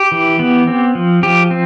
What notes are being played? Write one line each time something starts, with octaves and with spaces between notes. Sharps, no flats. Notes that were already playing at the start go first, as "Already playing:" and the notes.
Already playing: G4
E3
B3
C4
F3
F3 G4
C4